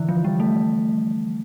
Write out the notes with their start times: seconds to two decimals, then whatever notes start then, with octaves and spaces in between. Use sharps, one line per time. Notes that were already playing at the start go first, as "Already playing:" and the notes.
Already playing: D3 E3
0.09 F3
0.24 G3
0.40 A3